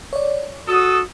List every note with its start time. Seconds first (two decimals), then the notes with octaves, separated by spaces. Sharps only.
0.13 C#5 D5
0.68 F#4 A4 D#6